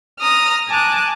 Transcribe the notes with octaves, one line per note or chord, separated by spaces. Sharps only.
A#5 D#6 F6
G#5 A5 D6 F#6